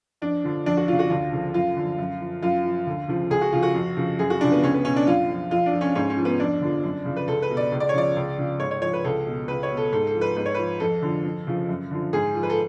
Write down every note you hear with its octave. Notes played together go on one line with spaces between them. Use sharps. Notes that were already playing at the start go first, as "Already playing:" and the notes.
F2 D4
D3 F3
F2 D4
F#4
C#3 F3 F4
F#4
D2 F4
C#3 F3
F#2 F4
D3 F3
F#2
F3
F#2 F4
F3
D2
C#3 F3
C#2 G#4
F#4
C#3 F3 F4
F#4
F2
C#3 F3
F#2 G#4
F#4
C#3 F3 D4
B3
C#2 C#4
B3
B2 C#4
D4
F#2 F4
F3
F2 F4
D4
F3
C#4
G#2 C#4
C#4
F3
B3
F2 D4
D3 F3
F#2
C#3 F3
B4
C#2 A4
B4
B2
D5
C#2
D5
C#5
C#3 F3 D5
C#2
C#3 F3
G#2 C#5
C#5
F3 C#5
B4
C#2 A4
B2
C#2 B4
C#5
B2
A4
G#2 A4
A4
F3
B4
G#2 B4
C#5
F3 B4
F2 A4
D3 F3
F2
C#3 F3
F#2
D3 F3
G#2 G#4
F3
B4
A4